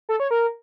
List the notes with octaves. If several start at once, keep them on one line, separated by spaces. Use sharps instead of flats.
A4
C#5
A#4